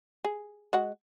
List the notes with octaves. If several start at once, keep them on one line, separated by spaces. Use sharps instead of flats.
G#4
G#3 F#4 F#5